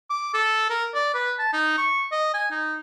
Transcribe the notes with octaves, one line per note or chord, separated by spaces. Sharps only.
D6
A4
A#4
D5
B4
A5
D#4
C#6
D#5
G#5
D#4